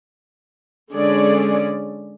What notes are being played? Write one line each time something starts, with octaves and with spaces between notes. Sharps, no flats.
D3 G#3 C#4 G#4 D5